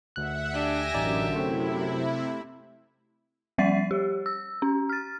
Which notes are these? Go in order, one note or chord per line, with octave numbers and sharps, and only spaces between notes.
D2 E5 F#5 F#6
D4 G4 E5 G#5 A#6
A1 F#2 D3 D#4 D5
C3 A3 C4 E4
F3 G3 D5 F#5 A6 C7
G4
E6
C#4
F6 A6